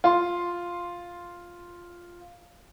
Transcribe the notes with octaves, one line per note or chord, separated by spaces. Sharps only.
F4 C6